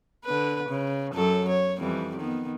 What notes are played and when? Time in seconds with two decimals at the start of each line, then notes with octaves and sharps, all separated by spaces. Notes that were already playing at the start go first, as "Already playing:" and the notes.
0.25 D3 B4
0.70 C#3
1.13 F#2 F#3 A4
1.49 C#5
1.79 F2 E3 G3
2.18 D#3 B3